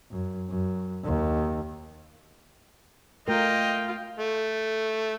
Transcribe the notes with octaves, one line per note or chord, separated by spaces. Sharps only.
F#2
F#2
D#2
A3 F4 A#4 D#5 G5
A3